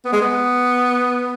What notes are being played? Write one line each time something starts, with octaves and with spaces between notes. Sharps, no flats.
B3
G#3
B3